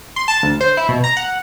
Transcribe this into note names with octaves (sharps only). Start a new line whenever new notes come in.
C6
A5
D2
C5
E4
B2
A#5
F#5